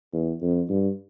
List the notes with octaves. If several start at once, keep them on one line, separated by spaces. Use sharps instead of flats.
E2
F2
G2